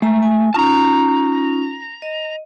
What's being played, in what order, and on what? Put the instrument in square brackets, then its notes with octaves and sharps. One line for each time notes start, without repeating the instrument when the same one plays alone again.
[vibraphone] G#3 A#5 [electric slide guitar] A3
[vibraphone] G#5
[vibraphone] C#4 D#4 F4 [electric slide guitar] A5 A#5
[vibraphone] D#5